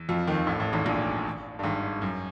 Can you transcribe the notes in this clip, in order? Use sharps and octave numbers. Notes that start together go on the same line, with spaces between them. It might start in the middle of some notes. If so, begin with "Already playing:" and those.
Already playing: E2
F2 F3
D#2 D#3
A1 A2
A1 A2
G#1 G#2
A#1 A#2
G2
G#1 G#2
F#2